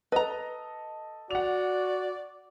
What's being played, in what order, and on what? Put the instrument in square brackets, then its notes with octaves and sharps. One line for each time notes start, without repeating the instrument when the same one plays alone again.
[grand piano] A4 D#5 [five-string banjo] B4 A#5
[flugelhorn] F#4 [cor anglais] D5 [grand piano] F#5 F7